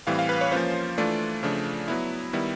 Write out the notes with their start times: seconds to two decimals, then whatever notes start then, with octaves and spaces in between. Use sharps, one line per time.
0.07 A2 E3 G3 C4 F5
0.19 F5
0.29 B4
0.41 C#5
0.52 F3 A#3 C#4 F4 C5
0.98 E3 A3 D4 F4 D5
1.43 C#3 F3 A3 D4
1.88 F#3 B3 E4
2.33 D#3 G3 B3 E4